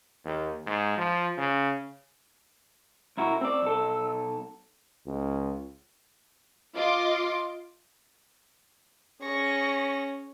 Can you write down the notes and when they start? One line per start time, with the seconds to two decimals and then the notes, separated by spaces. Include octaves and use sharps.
0.25 D#2
0.66 G#2
0.98 F3
1.38 C#3
3.17 B1 E4 F#4 A#5
3.41 C4 D5 E6
3.62 B1 A4
5.06 C#2
6.75 F4 D#5 C6 D6
9.22 C#4 G#4 C#6 A#6